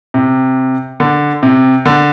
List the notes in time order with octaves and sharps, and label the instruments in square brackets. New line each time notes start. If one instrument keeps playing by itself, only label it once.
[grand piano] C3
D3
C3
D3